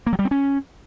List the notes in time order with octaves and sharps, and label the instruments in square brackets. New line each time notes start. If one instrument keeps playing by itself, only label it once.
[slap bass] A#3
F#3
G3
C4
C#4